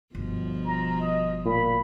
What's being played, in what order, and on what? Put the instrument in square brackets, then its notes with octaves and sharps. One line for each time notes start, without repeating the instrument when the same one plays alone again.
[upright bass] G1 [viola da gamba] B2 F3
[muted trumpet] A#5
D#5
[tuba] A#2 [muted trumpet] B5